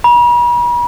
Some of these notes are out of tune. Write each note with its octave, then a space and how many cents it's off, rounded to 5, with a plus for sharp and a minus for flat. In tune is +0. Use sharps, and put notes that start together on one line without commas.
B5 -45